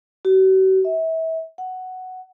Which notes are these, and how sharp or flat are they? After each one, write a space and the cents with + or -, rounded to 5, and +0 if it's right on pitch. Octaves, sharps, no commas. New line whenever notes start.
F#4 +45
E5 -30
F#5 +5